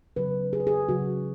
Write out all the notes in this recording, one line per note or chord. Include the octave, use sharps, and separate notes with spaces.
C#3 F#3 B4
G#4
B4
G#4
C#3 F#3 F#4